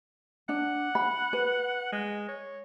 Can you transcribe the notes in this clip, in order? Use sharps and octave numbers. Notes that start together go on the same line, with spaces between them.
D4 F#5
B5
B4
G#3
C#5